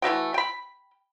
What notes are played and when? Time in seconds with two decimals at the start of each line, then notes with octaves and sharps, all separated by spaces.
0.02 E3 A3 F#4 G5
0.34 G5 B5